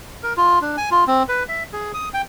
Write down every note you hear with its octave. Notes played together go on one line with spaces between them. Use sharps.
A#4
F4
D4
G#5
F4
C4
B4
E5
G#4
D#6
G5